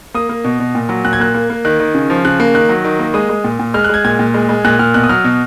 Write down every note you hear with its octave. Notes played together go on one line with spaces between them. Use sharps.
A#3 D#6
A#3
B2
B2
A#2
F#3
A#2 F#6
G#6
A#3 F#6
A#3
A#3
D#3 F#6
D#3
C#3
F3
C#3 F#6
A#3
D#3 F#6
F#3
D#3
A#3
G#3 D#6
G#3
A#2
A#2
G#3 F6
F#6
G#3 G#6
A#2 G#6
A#2
G#3
G#3
A#2 F#6
A#2 F6
B2 F#6
D#6
F#3 F6
B2